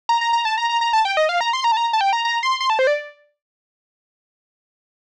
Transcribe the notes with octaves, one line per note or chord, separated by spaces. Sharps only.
A#5
A#5
A#5
A5
A#5
A#5
A#5
A5
G5
D#5
F5
A#5
C6
A#5
A5
A#5
A5
G5
A#5
A#5
C6
C6
A5
C5
D5